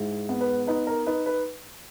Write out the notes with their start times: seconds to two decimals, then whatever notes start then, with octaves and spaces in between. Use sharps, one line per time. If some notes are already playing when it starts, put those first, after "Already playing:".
Already playing: G#2 E4
0.29 B3
0.41 B4
0.67 D#4 B4
0.87 A#4
1.07 D#4 B4
1.26 B4